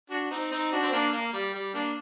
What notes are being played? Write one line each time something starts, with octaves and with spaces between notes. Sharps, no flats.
D4 F#4
C4 D#4
C4 D#4
D4 F#4
C4
A#3 D4
A#3
G3
G3
A#3 D4